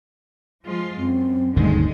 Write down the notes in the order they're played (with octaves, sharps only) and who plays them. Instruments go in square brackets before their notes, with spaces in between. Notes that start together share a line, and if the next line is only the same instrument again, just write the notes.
[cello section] F3 G#3 F4
[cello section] F#2 [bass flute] C4
[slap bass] D#1 D2 G2 [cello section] D3 G3 G#3 [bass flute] D#4